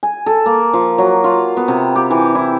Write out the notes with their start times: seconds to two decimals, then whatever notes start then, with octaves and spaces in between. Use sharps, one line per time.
0.03 G#5
0.26 A4
0.46 A#3
0.74 F3
0.98 F#3
1.24 F4
1.57 B3
1.68 C3
1.96 G4
2.11 E3
2.35 E4